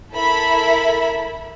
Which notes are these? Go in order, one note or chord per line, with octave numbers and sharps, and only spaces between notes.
E4 A4 A#4 E5 B5